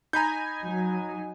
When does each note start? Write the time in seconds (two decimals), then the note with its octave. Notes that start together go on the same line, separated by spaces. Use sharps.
0.13 D#4 G#5 A#5 B5 G6
0.62 F#3